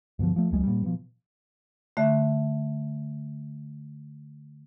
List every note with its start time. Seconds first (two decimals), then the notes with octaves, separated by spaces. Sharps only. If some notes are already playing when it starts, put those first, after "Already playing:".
0.19 G2 B2 D3 F3
0.36 F3 A3
0.51 E1 C#2 F#3 G#3
0.64 A#2 G3
0.84 B2 F3
1.97 D3 A3 E5